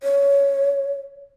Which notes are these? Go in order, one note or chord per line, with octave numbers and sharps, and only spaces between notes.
C#5